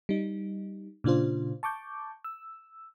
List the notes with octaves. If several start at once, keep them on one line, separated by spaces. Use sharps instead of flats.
G3 D#4
A#2 C#3 D4 F4 C5
A5 C#6 D6 G6
E6